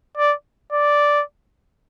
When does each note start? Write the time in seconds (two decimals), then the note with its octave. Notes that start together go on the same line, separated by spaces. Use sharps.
0.17 D5
0.73 D5